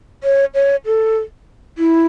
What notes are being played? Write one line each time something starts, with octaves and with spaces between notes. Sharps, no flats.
C#5
C#5
A4
E4